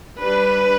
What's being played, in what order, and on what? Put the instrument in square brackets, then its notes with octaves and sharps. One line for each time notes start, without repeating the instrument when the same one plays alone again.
[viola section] G3 D4 B4